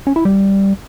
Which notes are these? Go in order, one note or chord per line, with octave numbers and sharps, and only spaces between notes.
C#4
E4
G3